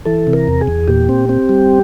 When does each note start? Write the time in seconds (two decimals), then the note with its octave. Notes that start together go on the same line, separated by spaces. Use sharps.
0.05 E3 A4
0.27 C3
0.33 A#4
0.47 E2
0.61 G#4
0.67 E2
0.88 A#2 G4
1.09 C4
1.29 C4
1.49 G3